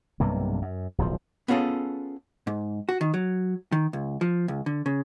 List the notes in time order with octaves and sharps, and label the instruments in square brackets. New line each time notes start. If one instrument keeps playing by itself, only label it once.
[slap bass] B1 G2 C3 A#3
F#2
D1 B1 F3
[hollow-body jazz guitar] B3 C#4 F4 G#4 A4
G#2
F#4
D#3
F#3
D#3
C#2
F3
C#2
D3
C#3